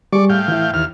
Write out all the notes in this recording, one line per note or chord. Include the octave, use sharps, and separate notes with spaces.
G3 G#4 D5 C#6 D6
A2 F5 G5
E3 E4
D#2 F6